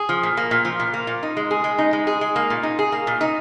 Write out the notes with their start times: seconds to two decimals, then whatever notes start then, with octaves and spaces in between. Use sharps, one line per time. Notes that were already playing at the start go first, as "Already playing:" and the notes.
Already playing: G#4
0.09 F3
0.23 A#2
0.37 A#3
0.51 A#2
0.65 F3
0.80 A#2
0.94 A#3
1.07 A#2
1.23 D#4
1.37 G#3
1.51 G#4
1.64 G#3
1.78 D#4
1.93 G#3
2.07 G#4
2.21 G#3
2.36 A#3
2.50 A#2
2.63 D#4
2.79 G#4
2.92 A#3
3.07 A#2
3.21 D#4